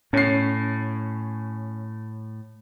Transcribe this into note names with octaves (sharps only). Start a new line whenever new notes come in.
A2 C#4 C7